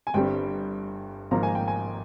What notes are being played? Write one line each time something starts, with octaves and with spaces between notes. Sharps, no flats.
G#5
G1 G2 G3 C4 G5
G#1 G#2 F3 A#3 A#5
G#5
G5
G#5